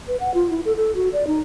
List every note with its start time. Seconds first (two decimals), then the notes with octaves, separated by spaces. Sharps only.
0.08 B4
0.20 F#5
0.34 F4
0.50 E4
0.65 A4
0.77 A4
0.95 F#4
1.13 D5
1.27 D#4